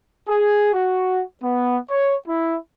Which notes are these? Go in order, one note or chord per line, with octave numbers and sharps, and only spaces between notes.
G#4
F#4
B3
C#5
E4